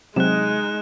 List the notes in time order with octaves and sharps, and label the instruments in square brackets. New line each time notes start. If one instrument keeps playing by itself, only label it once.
[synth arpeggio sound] C3 F#3 [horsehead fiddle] G#3 D#4 [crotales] F#6 E7